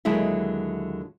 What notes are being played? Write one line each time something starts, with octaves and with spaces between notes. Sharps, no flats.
D#2 D3 F#3 G#3 E4 E5